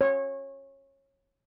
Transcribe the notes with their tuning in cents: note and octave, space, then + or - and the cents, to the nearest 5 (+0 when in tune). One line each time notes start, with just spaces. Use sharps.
C#5 -20